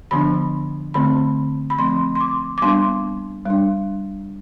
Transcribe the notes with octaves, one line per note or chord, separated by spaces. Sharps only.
D3 F3 B3 D4 B5
D3 A3 C4 B5
B5
F3 A3 C4 C6
C6
D6
D6
G3 B3 D4 C6
G3 D4